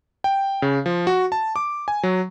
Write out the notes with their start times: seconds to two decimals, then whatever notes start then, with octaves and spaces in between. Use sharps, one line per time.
0.24 G5
0.62 C#3
0.86 F3
1.07 F#4
1.32 A5
1.56 D6
1.88 G#5
2.03 F#3